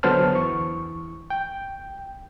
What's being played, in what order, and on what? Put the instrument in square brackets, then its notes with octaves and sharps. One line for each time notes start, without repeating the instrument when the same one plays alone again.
[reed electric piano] D3 F#3 B3 C5 A5 F6
E2 E3 C#6
G5